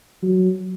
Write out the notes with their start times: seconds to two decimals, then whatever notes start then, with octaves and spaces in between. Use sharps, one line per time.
0.23 F#3